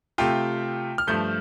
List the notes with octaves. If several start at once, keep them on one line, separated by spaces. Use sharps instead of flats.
C3 A3 F4 G5
F6
G2 F3 A3 G6